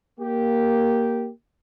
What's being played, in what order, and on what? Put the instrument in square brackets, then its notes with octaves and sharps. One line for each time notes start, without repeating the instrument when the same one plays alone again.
[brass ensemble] A#3 G4